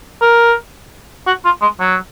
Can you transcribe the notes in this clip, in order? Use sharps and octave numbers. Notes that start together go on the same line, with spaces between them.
A#4
F#4
F4
G#3
F#3